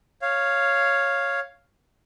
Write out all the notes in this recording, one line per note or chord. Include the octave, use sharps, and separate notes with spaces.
C#5 F5